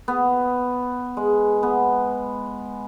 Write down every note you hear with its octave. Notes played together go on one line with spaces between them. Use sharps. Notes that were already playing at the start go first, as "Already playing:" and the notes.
B3
G#3
B3